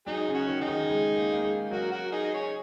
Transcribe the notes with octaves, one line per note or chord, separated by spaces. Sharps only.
F#3 D#4 G#4
C#3
C#4 F#4
D#3
D#4 G#4
D#3
G#3
A#3
A#3
G#3
F#3 F#4 A#4
F#4 A#4
D#4 G#4
D#5
G#4 C#5